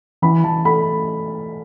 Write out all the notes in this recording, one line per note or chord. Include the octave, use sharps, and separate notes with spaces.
E3 B5
E3 A5
A3 B5